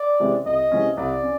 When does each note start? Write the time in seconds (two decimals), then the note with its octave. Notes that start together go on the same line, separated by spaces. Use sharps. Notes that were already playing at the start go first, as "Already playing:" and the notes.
Already playing: D5
0.20 C3 E3 G#3 C#4
0.45 C2 D#5
0.71 C3 E3 G#3 C#4
0.97 C2 D5
1.23 C#4